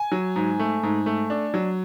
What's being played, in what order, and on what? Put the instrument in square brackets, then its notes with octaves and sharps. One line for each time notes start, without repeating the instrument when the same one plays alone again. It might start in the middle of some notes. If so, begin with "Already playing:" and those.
Already playing: [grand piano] G#5
F#3
G#2
A3
G#2
A3
D4
F#3